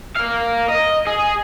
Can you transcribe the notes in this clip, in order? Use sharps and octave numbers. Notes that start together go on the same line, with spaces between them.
A#4 F5
D#5
G#4